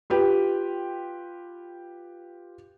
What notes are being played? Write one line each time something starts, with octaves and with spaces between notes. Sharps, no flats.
F4 G4 B4 G5